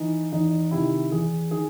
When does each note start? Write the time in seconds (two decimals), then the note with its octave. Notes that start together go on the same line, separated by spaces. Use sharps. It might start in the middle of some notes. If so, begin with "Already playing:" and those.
Already playing: E3 D#4
0.32 E2 D#4
0.71 C3 D#3 E4
1.11 E2 G#4
1.51 D#3 G#4